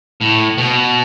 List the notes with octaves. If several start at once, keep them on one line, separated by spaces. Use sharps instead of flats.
A2
B2